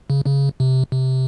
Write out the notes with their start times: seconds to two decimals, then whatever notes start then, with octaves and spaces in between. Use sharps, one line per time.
0.10 C#3
0.26 C#3
0.60 C3
0.92 C3